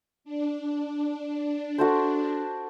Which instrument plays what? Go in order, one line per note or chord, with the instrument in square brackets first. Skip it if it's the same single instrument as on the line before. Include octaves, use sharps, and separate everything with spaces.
[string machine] D4
[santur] F#4 A4 C5